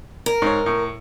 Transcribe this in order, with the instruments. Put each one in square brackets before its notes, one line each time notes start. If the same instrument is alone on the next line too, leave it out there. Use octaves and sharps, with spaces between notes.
[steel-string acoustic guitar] A#4
[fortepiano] G#2 C#5
A2